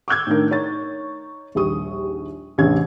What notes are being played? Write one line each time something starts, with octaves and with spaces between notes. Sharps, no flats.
D6 E6 G6 G#6
A2 D#3 D4 A#4
D#4 C#5 A6
A#1 D#2 G3 C#6 D#6
A1 E2 C3 C#4 D4 G#6